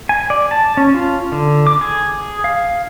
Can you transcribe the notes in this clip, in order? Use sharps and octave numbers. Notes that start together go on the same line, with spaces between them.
G#5
D5
A5
C#4
F4
D3
D6
G#4
F5